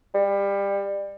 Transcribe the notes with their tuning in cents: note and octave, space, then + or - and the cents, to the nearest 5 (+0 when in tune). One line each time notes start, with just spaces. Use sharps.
G3 +25